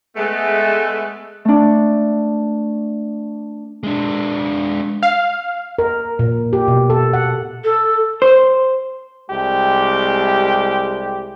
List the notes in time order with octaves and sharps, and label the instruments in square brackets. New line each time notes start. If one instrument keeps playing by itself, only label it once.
[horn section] G#3 A3 B3
[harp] A3 D4
[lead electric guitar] G#3 D4
[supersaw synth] F5
[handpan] A#4
A#2
G4
B2
A4
F#5
[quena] A4
[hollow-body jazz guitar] C5
[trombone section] C2 G#3 G4